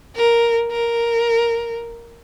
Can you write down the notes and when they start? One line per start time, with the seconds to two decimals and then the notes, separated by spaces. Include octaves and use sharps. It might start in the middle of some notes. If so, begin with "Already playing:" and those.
0.16 A#4
0.71 A#4